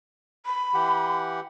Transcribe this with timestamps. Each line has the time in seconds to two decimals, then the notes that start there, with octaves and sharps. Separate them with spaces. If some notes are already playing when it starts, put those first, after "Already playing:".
0.46 B5
0.74 E3 G4 F#5